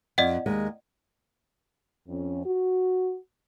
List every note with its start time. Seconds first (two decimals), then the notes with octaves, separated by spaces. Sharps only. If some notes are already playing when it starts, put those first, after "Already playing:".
0.18 F2 D5 D#5 F#5
0.46 D#2 G#3
2.08 F2 C#4
2.46 F#4